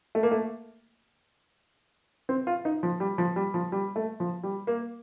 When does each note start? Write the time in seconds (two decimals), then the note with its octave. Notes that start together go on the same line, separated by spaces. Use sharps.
0.15 A3
0.23 A#3
0.31 A3
2.29 C4
2.47 F4
2.65 D#4
2.83 F3
3.00 G3
3.18 F3
3.36 G3
3.54 F3
3.72 G3
3.96 A3
4.20 F3
4.43 G3
4.67 A#3